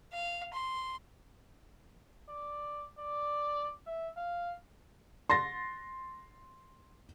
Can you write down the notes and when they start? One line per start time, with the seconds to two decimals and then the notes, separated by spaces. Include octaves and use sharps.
0.13 F5
0.54 C6
2.29 D5
2.99 D5
3.87 E5
4.17 F5
5.30 C6 A6 A#6